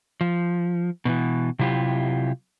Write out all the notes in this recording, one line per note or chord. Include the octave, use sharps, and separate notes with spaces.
F3
B2 D#3 E3
C3 F#3 E4 F4 G4